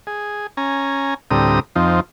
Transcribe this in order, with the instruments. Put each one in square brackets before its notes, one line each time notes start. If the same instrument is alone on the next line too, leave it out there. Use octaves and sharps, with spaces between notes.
[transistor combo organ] G#4
C#4 G#5 A#5
D2 A2 G3 C4 A#5 D#6
F2 F3 C4 D#4